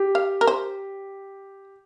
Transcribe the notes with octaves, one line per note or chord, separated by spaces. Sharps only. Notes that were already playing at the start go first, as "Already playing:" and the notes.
Already playing: G4
F5
A#4
C5